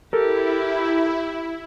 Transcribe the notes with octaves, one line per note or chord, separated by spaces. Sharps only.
E4 G4 A4 A#4